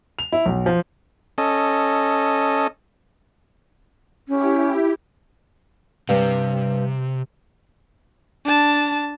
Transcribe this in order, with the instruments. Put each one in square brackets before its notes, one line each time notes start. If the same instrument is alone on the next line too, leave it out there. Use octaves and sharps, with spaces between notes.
[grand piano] F7
E4
B1
F3
[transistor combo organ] C#4 A4 D#5
[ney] C#4 [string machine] E4 G4
[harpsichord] G2 [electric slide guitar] C3
[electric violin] D4 A5